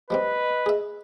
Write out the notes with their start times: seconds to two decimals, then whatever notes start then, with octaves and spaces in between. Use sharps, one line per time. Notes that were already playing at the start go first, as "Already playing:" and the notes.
0.10 F3 G3 C4 B4 D#5
0.66 G#4 E5